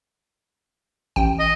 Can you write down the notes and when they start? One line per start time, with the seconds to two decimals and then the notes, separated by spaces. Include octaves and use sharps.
1.16 A1 G5
1.40 D#5